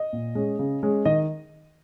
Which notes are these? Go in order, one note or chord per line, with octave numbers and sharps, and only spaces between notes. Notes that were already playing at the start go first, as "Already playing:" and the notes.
Already playing: D#5
A#2
G#3 C#4
C#3
G#3 C#4
D#3 D#5